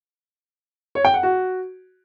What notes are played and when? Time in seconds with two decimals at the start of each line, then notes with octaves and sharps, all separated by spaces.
0.95 C#5
1.05 G5
1.14 F#5
1.23 F#4